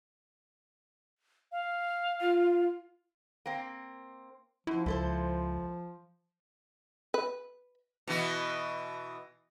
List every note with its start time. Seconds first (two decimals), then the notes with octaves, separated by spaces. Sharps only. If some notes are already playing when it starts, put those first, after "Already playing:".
1.52 F5
2.21 F4
3.46 A#3 C4
4.67 F#2 F3 E4
4.86 C#2 E4 A4 C5
7.14 B4
8.08 B2 E3 B3